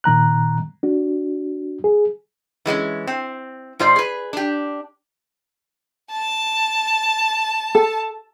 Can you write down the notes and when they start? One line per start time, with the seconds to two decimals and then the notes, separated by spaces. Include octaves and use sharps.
0.04 A#2 D#3 A#5 F#6
0.83 D4 F#4
1.84 G#4
2.66 E3 G#3 A#3 C#4
3.07 C4
3.79 G#2 F4 C5 D5
3.96 G#4 B4
4.33 D4 G4
6.12 A5
7.75 A4